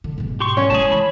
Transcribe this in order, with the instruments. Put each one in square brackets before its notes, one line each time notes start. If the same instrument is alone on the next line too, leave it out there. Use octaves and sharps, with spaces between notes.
[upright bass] D3
G#2 B2
[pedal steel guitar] G4 C6 C#6
[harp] C#4
[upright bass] G#3 E4 [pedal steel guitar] G#4 A5
[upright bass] E3 [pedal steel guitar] B5